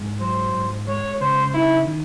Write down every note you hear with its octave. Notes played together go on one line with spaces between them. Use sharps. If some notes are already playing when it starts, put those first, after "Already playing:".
Already playing: G#2 G#3
F#3 C5
G#2
G#3 C#5
C#3 C5
D#4 E4
D#3